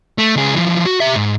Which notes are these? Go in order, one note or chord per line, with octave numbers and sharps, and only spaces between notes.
A3
C#2 G#4
E3 F3
F#4
G4 E5
G#2